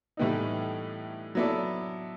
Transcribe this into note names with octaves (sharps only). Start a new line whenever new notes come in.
A2 E3 G3 B3 D#4
F#3 B3 E4 A4 D5